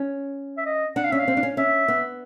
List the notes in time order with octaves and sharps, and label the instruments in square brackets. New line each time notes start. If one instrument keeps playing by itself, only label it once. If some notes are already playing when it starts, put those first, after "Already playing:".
Already playing: [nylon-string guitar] C#4
[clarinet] E5
D#5
[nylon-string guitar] D4 [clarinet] F#5
[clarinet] F5
[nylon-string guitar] C#4 [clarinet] E5
[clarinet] F5
[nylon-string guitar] C4
D4
C#4
[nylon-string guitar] C#4 [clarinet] E5
[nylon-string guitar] B3